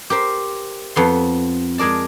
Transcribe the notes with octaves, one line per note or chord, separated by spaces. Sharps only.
G4 A#4 C5
F2 B3 C6
G#3 G#4 A#4 D5 A5